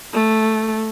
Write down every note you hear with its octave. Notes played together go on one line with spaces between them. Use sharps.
A3